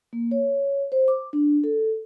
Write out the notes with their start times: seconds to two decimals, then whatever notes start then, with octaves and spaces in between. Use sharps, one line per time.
0.13 A#3
0.31 C#5
0.92 C5
1.08 D6
1.33 D4
1.64 A4